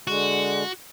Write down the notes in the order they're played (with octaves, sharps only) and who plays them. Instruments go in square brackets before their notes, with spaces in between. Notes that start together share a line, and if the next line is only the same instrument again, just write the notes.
[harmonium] D3 G#3 [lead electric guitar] F#4